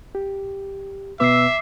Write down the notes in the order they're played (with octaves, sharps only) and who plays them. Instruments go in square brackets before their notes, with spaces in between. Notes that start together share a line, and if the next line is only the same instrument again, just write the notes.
[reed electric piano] G4
[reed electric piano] B2 B3 B4 [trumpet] E5 [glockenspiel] D6 E6 C7